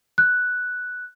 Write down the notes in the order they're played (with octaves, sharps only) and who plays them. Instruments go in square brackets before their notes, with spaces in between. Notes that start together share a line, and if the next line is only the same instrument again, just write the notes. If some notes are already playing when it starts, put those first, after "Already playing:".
[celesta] F#6